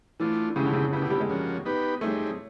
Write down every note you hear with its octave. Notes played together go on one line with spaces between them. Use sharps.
E3 A3 D4 F4
C#3 G#3 C4 E4 G4
D3
C#3
C#3 B3 E4 G4
D3
G3
G#3
F3 A#3 C#4 F#4
B3 D#4 G4 B4
G3 A3 C4 D#4 G#4